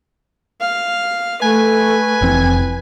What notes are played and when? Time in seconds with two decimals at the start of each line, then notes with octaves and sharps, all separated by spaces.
0.61 F5
1.42 A3 B4 G#5
2.21 F1 F2 E3 C4